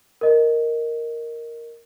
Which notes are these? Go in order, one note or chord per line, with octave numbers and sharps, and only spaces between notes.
A#4 D#5